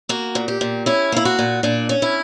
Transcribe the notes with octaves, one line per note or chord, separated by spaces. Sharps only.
A#3 F#4
A#2
G4
A#2
C#4 E4
A#3 E4
F#4
A#2
A#2 D4
C#4
E4